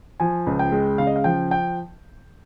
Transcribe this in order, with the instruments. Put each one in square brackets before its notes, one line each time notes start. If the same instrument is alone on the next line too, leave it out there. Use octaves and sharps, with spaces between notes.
[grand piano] F3 G#5
C#2
G5
G#3
C#3 F5
D#5
F5
F3 G5
G5